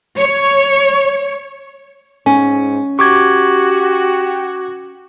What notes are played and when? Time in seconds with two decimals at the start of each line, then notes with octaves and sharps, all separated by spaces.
0.18 C#5
2.26 G#2 C#4
2.99 F#4 G4 C#6 D6 G#6